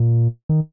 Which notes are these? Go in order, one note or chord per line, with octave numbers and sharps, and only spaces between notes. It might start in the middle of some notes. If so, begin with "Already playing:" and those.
Already playing: A#2
D#3